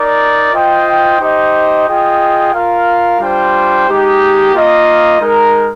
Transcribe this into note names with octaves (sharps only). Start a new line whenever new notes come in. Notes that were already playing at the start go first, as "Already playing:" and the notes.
Already playing: D#4 A#4 D5
F4 C5 D#5 G5
D#4 G4 C5 D#5
F4 G#4 D#5 G5
F4 A#4 F5
G3 D4 F4 C5 G5
G#3 D#4 G4
A#3 F4 A#4 D#5
G#3 D#4 A#4